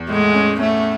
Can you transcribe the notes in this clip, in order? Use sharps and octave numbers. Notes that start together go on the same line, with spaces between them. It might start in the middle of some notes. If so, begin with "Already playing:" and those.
Already playing: E2
A2 G#3
C#4
A3 C#4